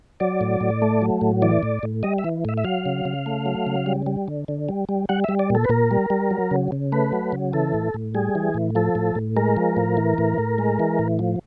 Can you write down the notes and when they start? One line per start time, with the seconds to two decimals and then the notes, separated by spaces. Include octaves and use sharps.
0.20 F#3 D5
0.41 A2
0.61 A2
0.82 A3
1.02 F#3
1.21 A2
1.42 E3 D5
1.63 A2
1.83 A2
2.03 G3 D#5
2.18 E5
2.24 E3
2.45 A2 E5
2.57 E5
2.64 F#3 F5
2.85 C#3
3.05 C#3
3.26 A3
3.46 F#3
3.67 C#3
3.86 G3
4.06 G3
4.28 D3
4.48 D3
4.69 G3
4.89 G3
5.09 G3 F#5
5.24 G3 E5
5.39 D5
5.50 A#2 A4
5.65 B4
5.69 A#2 A#4
5.91 G3
6.10 G3
6.31 F#3
6.51 C#3
6.72 C#3
6.92 A3 B4
7.13 F#3
7.32 C#3
7.53 E3 A4
7.74 A2
7.94 A2
8.15 G3 G#4
8.35 E3
8.54 A2
8.75 F3 A4
8.95 A2
9.15 A2
9.37 G#3 A#4
9.57 F3
9.77 A2
9.97 E3
10.18 A2
10.38 A2
10.58 G#3
10.80 E3
10.99 A2
11.19 F3